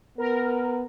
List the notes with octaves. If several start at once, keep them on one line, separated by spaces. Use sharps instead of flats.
B3 A#4